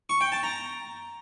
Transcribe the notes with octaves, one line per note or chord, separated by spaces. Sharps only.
C#6
G5
A5
A#5